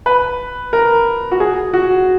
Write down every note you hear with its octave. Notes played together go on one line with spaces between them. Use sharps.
B4
A#4
F#4
G#4
F#4